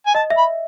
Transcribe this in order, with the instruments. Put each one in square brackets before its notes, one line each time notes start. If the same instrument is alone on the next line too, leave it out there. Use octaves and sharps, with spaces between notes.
[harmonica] G#5
[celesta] D#5 [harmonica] A5
[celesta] E5
[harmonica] B5